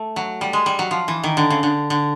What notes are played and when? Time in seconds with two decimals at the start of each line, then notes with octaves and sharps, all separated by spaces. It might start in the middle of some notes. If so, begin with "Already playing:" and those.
Already playing: A3
0.16 F#3
0.41 G3
0.53 G#3
0.66 G3
0.79 F#3
0.91 F3
1.08 E3
1.24 D#3
1.37 D3
1.50 C#3
1.63 D3
1.90 D3